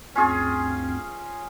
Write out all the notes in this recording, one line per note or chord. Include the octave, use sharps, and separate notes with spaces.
D2 G2 C4 C#4 F4 G#4